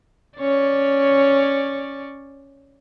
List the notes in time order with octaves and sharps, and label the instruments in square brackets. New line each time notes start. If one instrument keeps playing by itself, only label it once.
[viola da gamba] C#4 C#5 D5